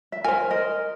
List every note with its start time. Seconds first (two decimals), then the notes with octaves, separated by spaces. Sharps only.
0.12 E5
0.24 A#4 C5 G#5
0.51 A#4 D#5